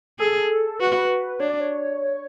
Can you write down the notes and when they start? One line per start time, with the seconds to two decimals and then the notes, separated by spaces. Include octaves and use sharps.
0.19 G#4 A4
0.80 F#4 B4
1.40 D4 C#5
1.50 D5
1.60 C#5